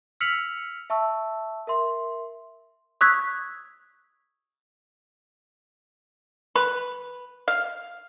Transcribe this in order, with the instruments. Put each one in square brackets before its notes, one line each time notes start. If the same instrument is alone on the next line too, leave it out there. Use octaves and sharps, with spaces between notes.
[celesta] E6 F6 B6 C#7 F7 F#7
E5 A5 C#6 E6
A#4 E5 C6
[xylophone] C#6 D#6 E6 F#6 G#6 B6
[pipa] B4 [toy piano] B5
[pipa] F5